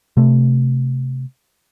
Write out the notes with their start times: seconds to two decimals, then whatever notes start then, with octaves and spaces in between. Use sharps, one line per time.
0.17 C3 A3